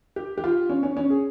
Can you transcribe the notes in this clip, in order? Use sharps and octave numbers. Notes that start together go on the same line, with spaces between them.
G4
G4
F4
C#4
C#4
C#4
G#4